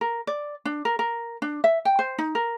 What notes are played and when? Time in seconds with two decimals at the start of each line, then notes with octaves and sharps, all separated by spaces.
0.01 A#4
0.27 D5
0.65 D4
0.85 A#4
0.99 A#4
1.42 D4
1.64 E5
1.85 G5
1.99 C5
2.18 D#4
2.35 A#4